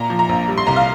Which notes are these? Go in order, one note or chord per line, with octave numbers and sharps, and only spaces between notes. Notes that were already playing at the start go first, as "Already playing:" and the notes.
Already playing: A#2 A#5
F3
A#5
A#1
G3
C6
C2 A#5
F5